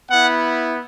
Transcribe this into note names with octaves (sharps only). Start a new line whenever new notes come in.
B3 E4 F#5